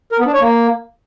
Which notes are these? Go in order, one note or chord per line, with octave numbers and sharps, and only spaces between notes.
A#4
B3
D4
C#5
A#3